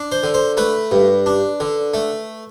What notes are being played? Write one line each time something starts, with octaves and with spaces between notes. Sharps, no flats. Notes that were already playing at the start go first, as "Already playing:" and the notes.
Already playing: D4
C5
D3
C5
A3 B4
G2
D4
D3
A3